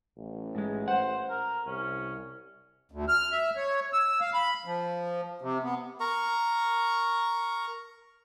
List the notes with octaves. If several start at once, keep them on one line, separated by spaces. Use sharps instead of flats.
A1
G#2 G#3
C5 F#5
A#4
C2 C#4
D2
F6
E5
C#5
E6
F5
B5
F3
C3
B3
A#4 A#5 C#6